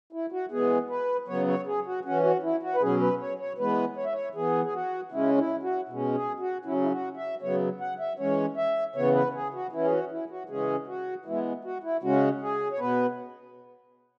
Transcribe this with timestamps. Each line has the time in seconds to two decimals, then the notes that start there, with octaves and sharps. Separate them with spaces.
0.13 E4
0.32 F#4
0.51 E3 G#3 B3 G#4
0.90 B4
1.28 C#3 F#3 B3 C#5
1.48 C#5
1.66 G#4
1.86 F#4
2.05 E3 C#4 F#4
2.24 F#4
2.43 E4
2.63 F#4
2.75 B4
2.82 B2 F#3 C#4 G#4
3.01 B4
3.20 C#5
3.39 C#5
3.58 E3 G#3 B3 B4
3.97 C#5
4.05 E5
4.13 C#5
4.35 E3 B3 G#4
4.64 G#4
4.74 F#4
5.12 C#3 G#3 C#4 E4
5.38 E4
5.63 F#4
5.89 B2 G#3 C#4
6.14 G#4
6.40 F#4
6.65 C#3 F#3 C#4 E4
6.82 E4
6.91 F#4
7.17 E5
7.42 C#3 F#3 B3 C#5
7.80 F#5
8.00 E5
8.19 E3 G#3 C#4 C#5
8.57 E5
8.96 C#3 E3 B3 C#5
9.15 B4
9.34 G#4
9.54 F#4
9.72 E3 C#4 E4
9.85 G#4
9.91 F#4
10.11 E4
10.30 F#4
10.49 C#3 E3 G#3 C#4 G#4
10.88 F#4
11.25 E3 G#3 B3 E4
11.65 F#4
11.84 E4
12.03 C#3 G#3 C#4 F#4
12.41 G#4
12.72 C#5
12.79 B2 B3 B4